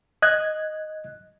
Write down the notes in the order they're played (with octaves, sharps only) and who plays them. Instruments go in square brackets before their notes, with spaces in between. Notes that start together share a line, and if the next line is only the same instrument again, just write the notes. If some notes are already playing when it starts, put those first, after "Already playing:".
[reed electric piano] D#5 F#6 G#6